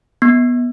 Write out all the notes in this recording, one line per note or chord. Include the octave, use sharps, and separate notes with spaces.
B3